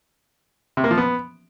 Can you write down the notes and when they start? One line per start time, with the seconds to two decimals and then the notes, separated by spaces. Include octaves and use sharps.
0.77 C3
0.84 A#3
0.91 F3
0.97 B3